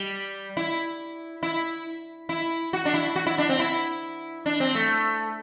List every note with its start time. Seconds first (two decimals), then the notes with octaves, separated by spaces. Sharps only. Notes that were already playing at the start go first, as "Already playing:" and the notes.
Already playing: G3
0.57 E4
1.43 E4
2.29 E4
2.73 F#4
2.85 D4
2.94 E4
3.16 F#4
3.26 E4
3.38 D4
3.49 C4
3.59 E4
4.46 D4
4.60 C4
4.75 A3